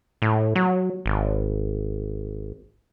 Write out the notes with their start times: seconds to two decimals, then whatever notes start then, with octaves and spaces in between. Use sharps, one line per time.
0.22 A2
0.56 F#3
1.06 G#1